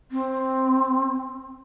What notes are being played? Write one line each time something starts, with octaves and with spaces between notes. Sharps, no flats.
C4